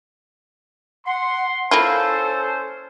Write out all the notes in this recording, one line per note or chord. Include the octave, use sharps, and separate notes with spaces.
F#5 C6
A#3 C#4 E4 F4 A4 C5